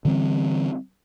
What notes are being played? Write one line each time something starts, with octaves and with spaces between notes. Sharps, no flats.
D3 E3 G3 C4